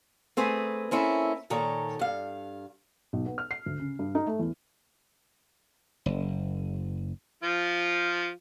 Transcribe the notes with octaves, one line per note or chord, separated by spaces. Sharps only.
A3 C4 G#4 B4
A#3 C4 C#4 E4 A4
A#2 D#3 A4 C#5 A#5
G2 F5
B1
B3
F6
C7
D2
C#3
G2
D#4
A3
E2
F#1
F3 F4